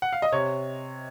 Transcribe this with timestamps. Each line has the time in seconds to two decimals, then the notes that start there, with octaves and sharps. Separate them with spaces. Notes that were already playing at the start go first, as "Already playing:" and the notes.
0.02 F#5
0.13 F5
0.22 D#5
0.32 C3 C#5